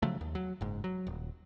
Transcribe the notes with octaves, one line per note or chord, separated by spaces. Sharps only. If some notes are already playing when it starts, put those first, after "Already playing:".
C#3 F3 F#3 A3
D#2
F#3
F#1 G#2
F#3
D#1